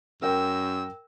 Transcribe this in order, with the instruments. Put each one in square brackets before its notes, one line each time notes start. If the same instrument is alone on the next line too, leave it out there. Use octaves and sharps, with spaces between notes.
[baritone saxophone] F#2 [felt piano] A#4 G5 [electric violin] E6